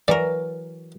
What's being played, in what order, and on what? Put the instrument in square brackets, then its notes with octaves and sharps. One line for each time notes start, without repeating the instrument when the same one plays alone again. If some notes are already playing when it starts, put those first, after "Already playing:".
[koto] E3 F#3 A#4 [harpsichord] D5